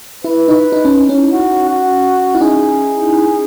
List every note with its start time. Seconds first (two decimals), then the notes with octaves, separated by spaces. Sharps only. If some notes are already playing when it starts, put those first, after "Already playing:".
0.24 E4 B4
0.48 D#4
0.72 D#4
0.85 C#4
1.09 C#4
1.33 F#4
1.69 F#4
2.35 E4
2.41 D#4 G#4